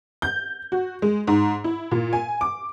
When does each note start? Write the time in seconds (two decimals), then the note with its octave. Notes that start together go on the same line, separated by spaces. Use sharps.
0.22 G6
0.72 F#4
1.02 G#3
1.27 G#2
1.64 E4
1.91 A#2
2.13 G#5
2.41 D6